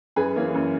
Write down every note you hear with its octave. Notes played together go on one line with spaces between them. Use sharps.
F#2 G#4 B4
E3 A#3 C#4
F#2